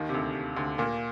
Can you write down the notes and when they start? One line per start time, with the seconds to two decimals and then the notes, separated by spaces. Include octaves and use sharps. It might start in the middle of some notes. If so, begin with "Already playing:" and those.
Already playing: D#2 D#3
0.09 C3
0.14 D2 D3
0.56 D2 D3
0.78 A#2 A#3